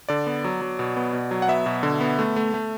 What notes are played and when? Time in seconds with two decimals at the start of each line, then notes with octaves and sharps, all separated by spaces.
0.09 D3 D5
0.27 B3
0.44 F#3
0.62 F#3
0.79 B2
0.97 B3
1.13 B2
1.31 F#3
1.42 F#5
1.48 B3 E5
1.66 B2
1.83 D3
2.01 B3
2.19 A3
2.36 A3
2.54 A3